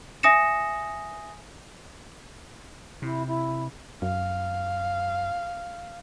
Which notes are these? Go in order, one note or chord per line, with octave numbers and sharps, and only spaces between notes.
E5 G#5 D#6 A#6 C#7 E7
C3 E4
E4
F#2 F5